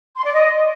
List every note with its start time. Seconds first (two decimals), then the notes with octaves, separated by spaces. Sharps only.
0.16 C6
0.25 D5
0.34 D#5